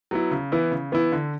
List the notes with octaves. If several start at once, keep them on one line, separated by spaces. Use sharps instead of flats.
F#3 B3 E4
C#3
E3 B3 E4
C#3
E3 B3 E4
D3